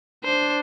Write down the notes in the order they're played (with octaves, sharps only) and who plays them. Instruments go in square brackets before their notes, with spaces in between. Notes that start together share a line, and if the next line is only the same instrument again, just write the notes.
[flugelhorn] D4 [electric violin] C5